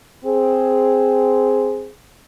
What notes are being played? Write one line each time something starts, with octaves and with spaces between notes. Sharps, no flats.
C4 G#4